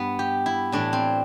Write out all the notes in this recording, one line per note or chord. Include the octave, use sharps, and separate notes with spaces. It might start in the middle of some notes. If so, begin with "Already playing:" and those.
Already playing: G2 B3
G4
E4
A2 E3 D4
C4